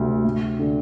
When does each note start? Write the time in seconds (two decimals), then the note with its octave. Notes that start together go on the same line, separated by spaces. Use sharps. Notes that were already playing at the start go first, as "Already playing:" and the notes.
Already playing: D2 C3
0.24 D2
0.59 D3